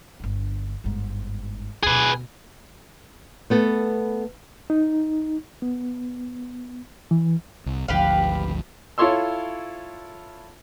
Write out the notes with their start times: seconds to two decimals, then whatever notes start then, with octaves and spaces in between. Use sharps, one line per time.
0.20 G1 D3
0.84 G1 G#2
1.83 D2 B2 G#4 B4
3.50 A3 B3 A4
4.70 D#4
5.62 B3
7.11 E3
7.66 C2
7.88 G#1 D2 F3 G4 B4 F5
8.98 E4 F4 A4 C#5 C6 E6